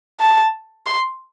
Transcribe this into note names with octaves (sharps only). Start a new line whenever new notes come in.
A5
C6